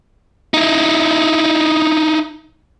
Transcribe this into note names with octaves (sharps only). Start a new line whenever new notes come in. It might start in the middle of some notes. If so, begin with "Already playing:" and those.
D#4 E4